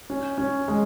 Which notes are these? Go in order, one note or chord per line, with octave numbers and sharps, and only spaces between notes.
C#4
C#4
G#3